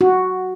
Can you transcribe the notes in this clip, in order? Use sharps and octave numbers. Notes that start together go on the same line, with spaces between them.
F#4